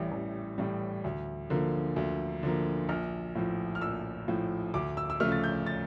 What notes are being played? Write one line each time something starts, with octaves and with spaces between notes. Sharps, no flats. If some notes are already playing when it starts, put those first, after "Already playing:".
Already playing: A1 A2 E3 G3
A1
A2 E3 G3
D2
D3 F3 A#3
D2
D3 F3 A#3
A#1 F6
A2 F3
F6
A#1 E6
A2 F3
D2 D6
E6
E6
C#3 F3 A3 F6
A6
G6
A6